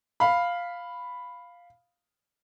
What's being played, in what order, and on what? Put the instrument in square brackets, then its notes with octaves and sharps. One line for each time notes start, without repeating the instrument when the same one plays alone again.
[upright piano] F5 B5